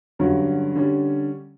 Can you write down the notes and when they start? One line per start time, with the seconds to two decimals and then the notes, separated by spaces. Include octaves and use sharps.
0.19 G2 D3 F#3 C#4 F#4
0.75 D3 G3 C#4